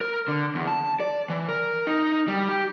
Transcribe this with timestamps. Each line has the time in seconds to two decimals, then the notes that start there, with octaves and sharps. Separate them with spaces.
0.01 A#4
0.28 D3
0.55 E2
0.67 A5
1.00 D5
1.29 E3
1.48 A#4
1.87 D#4
2.28 G3
2.49 G4